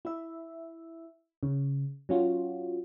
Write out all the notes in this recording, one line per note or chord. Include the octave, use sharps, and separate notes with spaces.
E4 E5
C#3
F#3 C#4 F4 F#4